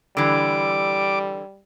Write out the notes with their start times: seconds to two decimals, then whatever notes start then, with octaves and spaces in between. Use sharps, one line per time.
0.17 D3 E3 G3 D6